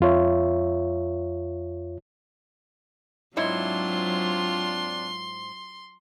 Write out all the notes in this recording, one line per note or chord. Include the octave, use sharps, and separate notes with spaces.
F2 F4 C#5 E5
G#2 F#3 C4 D4 E4 F4 C#5 C6